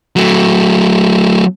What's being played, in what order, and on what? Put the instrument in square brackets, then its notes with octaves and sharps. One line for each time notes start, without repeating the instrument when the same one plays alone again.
[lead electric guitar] F#3 A3